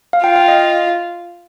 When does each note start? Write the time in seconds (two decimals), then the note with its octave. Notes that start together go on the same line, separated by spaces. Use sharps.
0.13 F5
0.24 F4 G5
0.36 F5
0.48 D#5